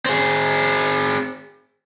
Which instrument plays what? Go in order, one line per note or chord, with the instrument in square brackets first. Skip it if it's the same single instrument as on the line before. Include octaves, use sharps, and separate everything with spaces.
[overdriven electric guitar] C4 G#4